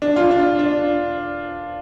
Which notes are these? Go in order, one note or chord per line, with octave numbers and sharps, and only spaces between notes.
D4
F4
D4
D4